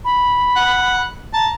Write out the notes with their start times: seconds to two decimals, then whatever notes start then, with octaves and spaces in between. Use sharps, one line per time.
0.05 B5
0.56 F#5
1.34 A5 A#5